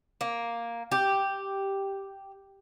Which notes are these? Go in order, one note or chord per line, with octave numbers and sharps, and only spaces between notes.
A#3
G4